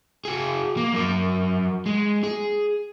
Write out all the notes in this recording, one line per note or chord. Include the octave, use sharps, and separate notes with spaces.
F#4 G#4
A#3
F#3 A#4
G#3
G#4